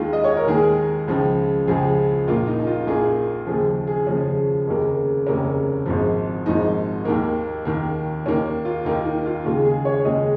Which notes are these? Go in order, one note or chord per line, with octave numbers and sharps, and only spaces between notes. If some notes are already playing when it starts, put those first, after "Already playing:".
Already playing: D#2 D#3 G#3 F4
D#5
C#5
A#4
D#2 D#3 G#3 G#4
C#2 C#3 F3
C#2 C#3 F3 G#4
A#1 A#2 A#3 F4
D#4
D#4
F4
A#1 A#2 A#3 G#4
D#2 C#3 F3 G#4
G#4
D#2 C#3 F3 C#4
F1 D#2 C#3 A#3
F1 D#2 C#3 A#3 C#4
G#1 G#2 F3
G#1 G#2 F3 D#4
D#2 D#3 A#3
D#2 D#3 A#3
D#2 D#3 A#3 C#4
F4
D#2 D#3 A#3 D#4
D#4
F4
D#2 C#3 G#3 F4
G#4
C#5
D#2 C#3 G#3 D#5